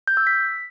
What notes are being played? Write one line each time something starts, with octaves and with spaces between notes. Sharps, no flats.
G6
E6
B6